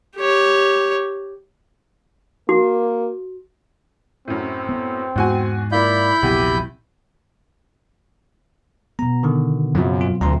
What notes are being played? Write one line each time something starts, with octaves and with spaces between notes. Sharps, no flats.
G4 C#5
A#3 F#4
F#2 A2 C4
B3
E2 G#2 F#4 G#5
A#3 E4 F4 D5 B5 G6
A#1 E2 C3 F#3 G4
B2 B3 A#5
D3 D#3
F#2 C#3 F#3 C4 F4
C4 F4
D2 A#5 C6